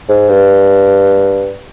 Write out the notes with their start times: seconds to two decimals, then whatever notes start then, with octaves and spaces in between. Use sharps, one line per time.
0.09 G#2
0.29 G2